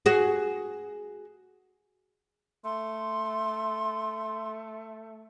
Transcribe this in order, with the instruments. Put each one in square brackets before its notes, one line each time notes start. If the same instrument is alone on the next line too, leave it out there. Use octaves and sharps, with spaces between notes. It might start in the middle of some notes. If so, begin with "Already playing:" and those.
[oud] F#4 G#4
[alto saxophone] A3 [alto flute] C6